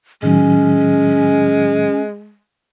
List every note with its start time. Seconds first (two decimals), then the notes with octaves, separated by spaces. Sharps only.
0.23 A2 D#3 F#3 G#3 C#4